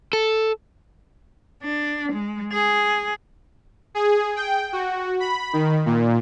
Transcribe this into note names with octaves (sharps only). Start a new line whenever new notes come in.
A4
D4
G#3
G#4
G#4
G5
F#4
B5
D#3
A#2